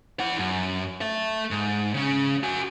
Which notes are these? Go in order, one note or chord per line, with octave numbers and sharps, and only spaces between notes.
E4 F#5
F#2
A4 E5
G#2
C#3 C#4
F#4 G#5